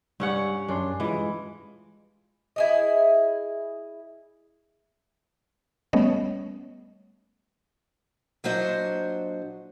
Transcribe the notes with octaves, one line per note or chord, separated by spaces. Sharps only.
G2 G3 C#4 F#5
F#2 C#4 D4 C6
E3 G#3 F4
E4 G#4 D#5
G3 A3 B3 C#4 C#5 D#5
A#2 F#3 D4 F#4 C5 D#5